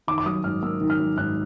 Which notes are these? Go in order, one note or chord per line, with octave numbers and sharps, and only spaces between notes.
D#3 D6
D6
F#3 D#6
G#2 F6
A#3 E6
D#3
F6
F#3
G#2 F#6